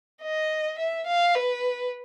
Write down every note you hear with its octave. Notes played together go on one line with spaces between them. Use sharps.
D#5
E5
F5
B4